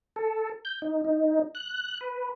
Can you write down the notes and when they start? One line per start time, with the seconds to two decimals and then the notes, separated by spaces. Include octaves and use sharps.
0.16 A4
0.65 G6
0.82 D#4
1.05 D#4
1.55 F#6
2.01 B4